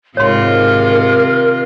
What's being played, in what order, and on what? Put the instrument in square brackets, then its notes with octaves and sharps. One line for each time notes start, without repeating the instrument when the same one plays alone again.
[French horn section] G#2 [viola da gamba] C3 D#3 F4 [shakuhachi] A#4 [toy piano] C#5 C6